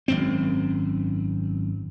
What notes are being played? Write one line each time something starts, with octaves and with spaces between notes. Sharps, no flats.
G#1 F#2 C4